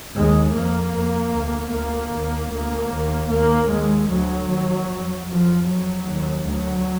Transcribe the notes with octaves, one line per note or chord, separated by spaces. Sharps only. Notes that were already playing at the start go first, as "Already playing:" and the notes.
D#2 G#3
F2 A#3
F2
D2
D2 A#3
D#2
D2 A#3
D#2
D#2 A#3
D#2 G#3
D2 F#3
D#2
F2
F2 F3
F2 F#3
D#2
D2 F#3